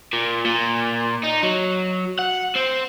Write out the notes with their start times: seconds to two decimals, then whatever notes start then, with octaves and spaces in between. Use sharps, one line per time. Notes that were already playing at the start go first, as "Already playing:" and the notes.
0.13 A#2
0.45 A#2
1.23 D#4
1.43 F#3
2.19 F#5
2.56 C4